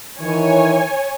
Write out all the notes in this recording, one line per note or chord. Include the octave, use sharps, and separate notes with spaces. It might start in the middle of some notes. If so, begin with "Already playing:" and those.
D#3 E3 C#5 G#5